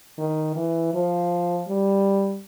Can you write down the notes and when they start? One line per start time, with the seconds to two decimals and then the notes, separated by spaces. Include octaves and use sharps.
0.18 D#3
0.56 E3
0.94 F3
1.68 G3